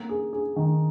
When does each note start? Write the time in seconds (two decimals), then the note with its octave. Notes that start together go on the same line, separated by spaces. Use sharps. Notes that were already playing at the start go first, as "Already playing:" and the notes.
Already playing: A#3
0.09 G#4
0.33 G#4
0.56 D#3